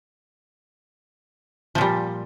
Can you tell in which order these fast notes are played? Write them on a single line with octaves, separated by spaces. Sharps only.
F3 A#2 G3